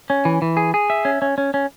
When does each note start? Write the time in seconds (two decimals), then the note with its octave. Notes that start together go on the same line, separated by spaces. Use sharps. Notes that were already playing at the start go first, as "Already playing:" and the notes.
0.10 C#4
0.25 E3
0.42 E3
0.57 G#4
0.74 G#4
0.90 E5
1.05 C#4
1.22 C#4
1.38 C#4
1.54 C#4